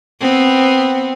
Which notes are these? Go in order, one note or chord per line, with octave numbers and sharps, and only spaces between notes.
B3 C4